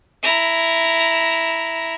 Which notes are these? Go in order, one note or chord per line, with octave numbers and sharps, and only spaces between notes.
E4 A#5